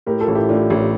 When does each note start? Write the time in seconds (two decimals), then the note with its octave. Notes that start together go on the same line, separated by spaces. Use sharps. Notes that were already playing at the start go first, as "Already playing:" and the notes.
0.07 A2 G4 A#4
0.21 F4 A4
0.28 A1
0.35 E4 G4
0.49 A2 D4 F4
0.70 A1